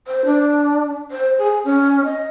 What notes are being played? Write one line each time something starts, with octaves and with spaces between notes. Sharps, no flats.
C5
D4
C5
G#4
C#4
D#5